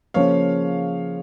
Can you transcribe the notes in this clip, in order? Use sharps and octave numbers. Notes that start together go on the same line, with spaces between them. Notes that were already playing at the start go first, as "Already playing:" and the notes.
C#3 F3 A#3 C#4 C#5 F5